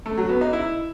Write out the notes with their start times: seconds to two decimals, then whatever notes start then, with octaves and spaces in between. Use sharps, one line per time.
0.06 A3
0.17 F#3
0.29 B3
0.41 D#4
0.53 E4